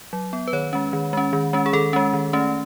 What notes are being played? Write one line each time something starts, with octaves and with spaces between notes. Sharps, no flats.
F#3
B3
B4
D#3 C#5
G#3 C#4
D#3
G#3 C#4
D#3
G#3 C#4
G#4
D#3 A4
G#3 C#4
D#3
A3 C#4